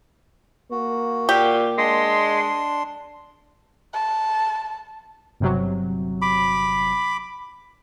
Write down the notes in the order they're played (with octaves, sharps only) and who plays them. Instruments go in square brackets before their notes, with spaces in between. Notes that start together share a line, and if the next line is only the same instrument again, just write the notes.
[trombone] A#3 [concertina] F#4
[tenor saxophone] A#2 [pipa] G4
[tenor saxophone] G#3 [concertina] D4 C6
[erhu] A5
[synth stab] G1 C3 F#3
[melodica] B5 D6